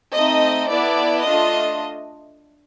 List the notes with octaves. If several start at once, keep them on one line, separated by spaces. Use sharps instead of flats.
A3 C4 D#4 D#5
B3 E4 A4 D5
A3 D4 F4 D#5